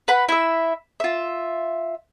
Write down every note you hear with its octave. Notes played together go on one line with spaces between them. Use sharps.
B4 F#5 B5
E4 E5
F4 E5